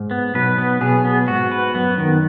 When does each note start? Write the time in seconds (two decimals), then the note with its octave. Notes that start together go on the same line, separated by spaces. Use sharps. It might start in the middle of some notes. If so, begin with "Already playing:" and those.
Already playing: G#2
0.11 B3
0.35 B1 B2 B4
0.58 B3
0.81 B1 B2 G#4
1.05 B3
1.28 G#2 F#4
1.52 B4
1.74 F#2 B3
1.98 D#3